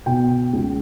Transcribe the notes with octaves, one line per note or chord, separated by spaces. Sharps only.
B2 G5
C#2